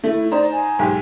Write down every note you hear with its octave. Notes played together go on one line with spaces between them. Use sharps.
A3 E4
D#4 C5 D5 A#5
G#5
B1 G#2 G4